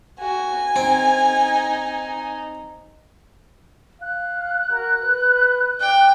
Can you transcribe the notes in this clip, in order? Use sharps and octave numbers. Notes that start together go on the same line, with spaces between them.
F#4 G#5
C4 D#4
F5 F#6
F#4 A#4
B4
D5 G5